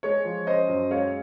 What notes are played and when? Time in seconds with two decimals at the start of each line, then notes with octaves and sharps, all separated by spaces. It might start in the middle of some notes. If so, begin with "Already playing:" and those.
0.03 G#3 C#5
0.25 F3
0.47 C#4 C5 D#5
0.68 F#2
0.91 G#3 C#5 F5